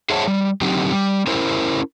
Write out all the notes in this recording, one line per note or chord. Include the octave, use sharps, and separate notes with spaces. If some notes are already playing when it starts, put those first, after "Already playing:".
G#4 C5 C#5 E5 F#5 A5
G3
D3 F#3 C4 D#4 G4
G3
C#4 E4 A#4 C5